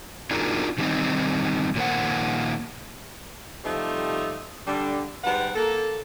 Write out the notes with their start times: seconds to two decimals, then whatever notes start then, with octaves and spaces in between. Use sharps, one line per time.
0.31 D4 D#4 F4 F#4 G#4 A#4
0.78 D#3 F#3 G3 A3 C4 D#4
1.76 A#2 D#3 A#3 C5 F#5
3.64 C3 F3 G3 A3 D#4 G4
4.67 D3 G3 D4
5.24 G#2 G3 B3 B4 F#5
5.56 A#3 A4